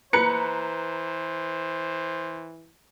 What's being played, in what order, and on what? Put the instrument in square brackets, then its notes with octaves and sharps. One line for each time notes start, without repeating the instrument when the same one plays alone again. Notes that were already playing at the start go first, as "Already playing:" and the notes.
[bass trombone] E3 [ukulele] B4 [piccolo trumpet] C5 [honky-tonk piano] A#5 F#6 C#7